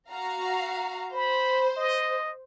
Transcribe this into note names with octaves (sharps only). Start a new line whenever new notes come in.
F#4 F5 A#5
C5 B5
D#5